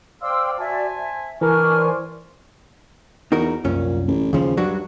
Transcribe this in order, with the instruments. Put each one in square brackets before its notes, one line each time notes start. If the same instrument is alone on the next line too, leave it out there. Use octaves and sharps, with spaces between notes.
[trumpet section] C5 D5 F5 [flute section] G5 C6 E6
[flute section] F#4 D5 E5 [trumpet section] C5 G#5 A5
[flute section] E5
[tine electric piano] E3 A#4 [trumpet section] D4 [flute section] G#5 C#6 F6
[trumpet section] C5 D5
[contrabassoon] E2 [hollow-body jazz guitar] D#4 F#4 A#4
[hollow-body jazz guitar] C2 F#2 C#4 [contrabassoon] A#2
[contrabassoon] A1
[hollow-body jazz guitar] D#2 F3 [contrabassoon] C#3
[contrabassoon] G2 [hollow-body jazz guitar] F#3 D4 F#4